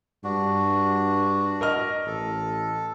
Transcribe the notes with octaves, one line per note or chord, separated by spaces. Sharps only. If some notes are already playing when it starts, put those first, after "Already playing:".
G2 D4 F#4
A#4 D#5 F6
A1 A4